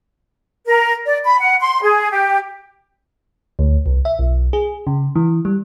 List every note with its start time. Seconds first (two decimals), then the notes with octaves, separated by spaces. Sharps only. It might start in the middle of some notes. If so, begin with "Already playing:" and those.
0.67 A#4
1.06 D5
1.24 B5
1.40 F#5
1.61 C6
1.83 G#4
2.11 G4
3.59 D2
3.86 C2
4.05 E5
4.19 B1
4.53 G#4
4.87 C#3
5.16 E3
5.45 G3